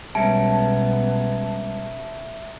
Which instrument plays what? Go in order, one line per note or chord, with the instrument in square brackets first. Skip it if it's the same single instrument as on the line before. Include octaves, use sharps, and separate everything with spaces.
[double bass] B1 B3 [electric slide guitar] G3 G#3 C#4 [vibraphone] E5 A#5 [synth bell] A5